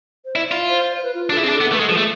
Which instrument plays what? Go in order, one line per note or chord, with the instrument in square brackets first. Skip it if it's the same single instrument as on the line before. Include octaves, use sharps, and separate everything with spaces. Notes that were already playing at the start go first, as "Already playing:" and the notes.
[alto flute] C5
[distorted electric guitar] E4 [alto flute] D5
[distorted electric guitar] F4
[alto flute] C5
C5
B4
F4
F4
[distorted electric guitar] D4
[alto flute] A4
[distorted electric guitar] E4 [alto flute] G#4
[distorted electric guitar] C4
D4
[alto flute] A4
[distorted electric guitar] B3
[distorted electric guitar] A3 [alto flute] B4
[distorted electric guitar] G#3 [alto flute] A4
[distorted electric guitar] F3 [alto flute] G#4
[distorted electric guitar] A3 [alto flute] A4